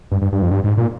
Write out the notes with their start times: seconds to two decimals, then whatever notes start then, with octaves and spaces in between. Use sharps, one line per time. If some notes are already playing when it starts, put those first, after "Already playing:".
0.12 G2
0.22 G2
0.32 G2
0.42 F2
0.51 G2
0.64 G#2
0.78 A#2